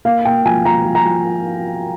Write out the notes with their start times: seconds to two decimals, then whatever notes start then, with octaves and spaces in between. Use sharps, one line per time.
0.05 A#3 F5
0.25 A#3 G5
0.45 F3 G#5
0.65 F3 A#5
0.85 F3
0.95 A#5
1.05 F3